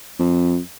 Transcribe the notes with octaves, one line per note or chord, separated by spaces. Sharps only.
F2